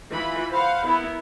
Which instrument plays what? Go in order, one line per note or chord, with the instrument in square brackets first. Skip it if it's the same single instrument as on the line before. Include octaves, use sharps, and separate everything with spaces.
[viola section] E3 F4 B5
[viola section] C5 F5 F#5 [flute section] B5
[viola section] B3 E4 A#4